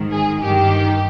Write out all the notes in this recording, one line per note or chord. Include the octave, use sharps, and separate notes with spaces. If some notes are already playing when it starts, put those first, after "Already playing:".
Already playing: G#2 D#3
G#4
G2 D#3 G4